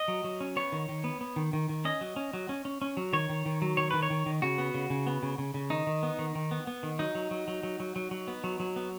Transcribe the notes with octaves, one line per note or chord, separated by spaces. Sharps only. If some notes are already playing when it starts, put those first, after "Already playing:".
Already playing: D#5
F#3
F#3
C#4
B3 C#5
D#3
D#3
B3
B3
D#3
D#3
D#3
C#4 D#5
F#3
C#4
F#3
C#4
C#4
C#4
F#3
D#3 C#5
D#3
D#3
F#3
D#3 C#5
D#3 B4
C#5
D#3
D#3
C#3 F#4
B3
C#3
C#3
B3
C#3
C#3
C#3
D#3 D#4
D#3
B3
D#3
D#3
B3
B3
D#3
F#3 D#4
F#3
F#3
F#3
F#3
F#3
F#3
F#3
B3
F#3
F#3
B3